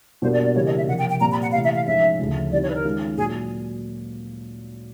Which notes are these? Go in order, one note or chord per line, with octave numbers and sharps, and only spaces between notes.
B2 G3 A#3 D4 C5
D5
D5
C#3 E3 G3 A#3 C#5
D#5
E5
C3 F3 A#3 F#5
G5
G5
A#2 G3 C4 F4 A#5
B5
F#5
C3 E3 A3 F5
E5
F5
G#2 F3 G#3 C#4 F4 E5
D2 C#3 F3 A3
D#3 G3 C4 E4 G4 D5
C#5
B4
A#4
D#3 G#3 C#4 F4
A#2 F#3 G#4